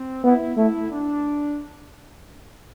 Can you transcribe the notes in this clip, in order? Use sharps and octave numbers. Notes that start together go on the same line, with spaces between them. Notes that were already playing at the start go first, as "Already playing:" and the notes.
Already playing: C4
B3 E4
A3 E4
D4